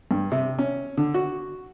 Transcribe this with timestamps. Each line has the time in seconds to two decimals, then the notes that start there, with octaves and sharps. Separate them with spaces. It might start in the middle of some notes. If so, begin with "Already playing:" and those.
0.11 G2
0.32 C3
0.59 C#4
0.97 D3
1.14 F#4